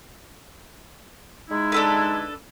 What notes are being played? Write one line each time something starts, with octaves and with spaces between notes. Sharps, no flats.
G#3 D#4 E4
D4 A4 B4